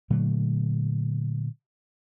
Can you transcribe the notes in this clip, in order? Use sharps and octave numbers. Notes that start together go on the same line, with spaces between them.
A#2 D3 F#3 A3